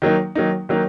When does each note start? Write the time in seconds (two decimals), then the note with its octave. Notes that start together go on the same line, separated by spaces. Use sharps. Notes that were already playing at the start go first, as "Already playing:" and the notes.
0.02 D#3 F#3 A#3 D#4
0.35 D#3 F#3 A#3 D#4
0.69 D#3 F#3 A#3 D#4